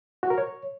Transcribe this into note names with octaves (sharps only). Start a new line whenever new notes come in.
F#4
A#4
C#5